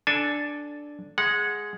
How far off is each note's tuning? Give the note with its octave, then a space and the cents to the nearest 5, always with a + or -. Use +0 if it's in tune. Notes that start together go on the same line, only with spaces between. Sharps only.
D4 +0 A4 +0 G#5 +20
G#3 +0 F#5 -15